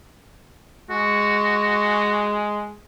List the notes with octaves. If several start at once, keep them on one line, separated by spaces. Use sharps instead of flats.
G#3 F#4